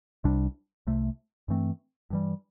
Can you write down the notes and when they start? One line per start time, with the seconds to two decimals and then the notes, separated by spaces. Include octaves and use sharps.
0.24 C2 C3 G3 D4
0.87 C2 C3 A3
1.48 G2 E3 A3 C4
2.10 G2 E3 G3